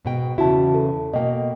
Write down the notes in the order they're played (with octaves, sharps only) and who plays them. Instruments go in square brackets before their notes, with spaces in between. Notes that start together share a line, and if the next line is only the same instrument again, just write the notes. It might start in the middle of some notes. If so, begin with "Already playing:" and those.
[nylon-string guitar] G#2 B2 G5
[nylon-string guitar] E2 C#3 E4 [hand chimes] F#4 A5
[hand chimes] A4
[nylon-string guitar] B2 A#3 [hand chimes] D#5 G5